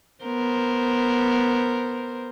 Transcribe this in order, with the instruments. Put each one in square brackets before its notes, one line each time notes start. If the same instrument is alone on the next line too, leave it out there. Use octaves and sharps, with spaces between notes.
[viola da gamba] B3 A#4 C5